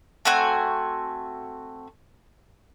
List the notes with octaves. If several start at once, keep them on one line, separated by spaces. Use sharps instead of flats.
A3 C4 F#4 G#5